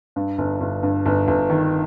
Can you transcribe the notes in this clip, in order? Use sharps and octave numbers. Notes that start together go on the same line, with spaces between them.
G2
G1
G1
G2
G1
G1
D#3